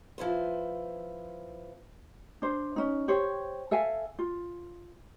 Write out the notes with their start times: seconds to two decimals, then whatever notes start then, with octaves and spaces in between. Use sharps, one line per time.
0.18 F3 E4 B4 C5
2.42 D4 C5
2.76 C#4 D#4
3.08 G4 C5 C#5
3.71 A4 E5 F5 G#5
4.19 F4